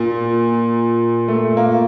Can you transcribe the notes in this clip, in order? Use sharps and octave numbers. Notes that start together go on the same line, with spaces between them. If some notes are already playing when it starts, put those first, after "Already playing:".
Already playing: A#2
A3
A#3